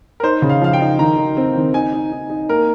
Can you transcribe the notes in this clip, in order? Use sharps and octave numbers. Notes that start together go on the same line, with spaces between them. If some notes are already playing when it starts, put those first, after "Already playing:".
A#4
D#4 C5
C#3
F5
F3 F5
G5
D#4
D#3 A#5
D#4
C4
D#3
D#4 G#5
D#4
D#4
D#4
A#3 A#4